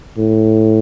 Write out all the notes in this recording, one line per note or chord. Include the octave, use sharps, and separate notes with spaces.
A2